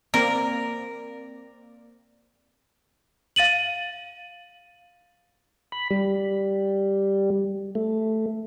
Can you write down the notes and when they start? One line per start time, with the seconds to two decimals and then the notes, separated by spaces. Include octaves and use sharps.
0.14 A#3 C4 A#4 D5
3.36 F5 A6 D#7 F#7
5.72 B5
5.90 G3
7.75 A3